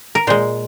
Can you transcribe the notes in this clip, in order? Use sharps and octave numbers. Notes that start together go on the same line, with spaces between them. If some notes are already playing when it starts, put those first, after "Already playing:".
A#4
A#2 G#3 C5